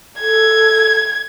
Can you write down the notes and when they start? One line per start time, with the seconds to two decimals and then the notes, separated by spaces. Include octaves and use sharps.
0.20 A4 G#6